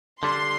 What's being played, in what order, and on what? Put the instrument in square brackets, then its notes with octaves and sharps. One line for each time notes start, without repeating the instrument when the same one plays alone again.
[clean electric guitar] D3 G3 D4 [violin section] C6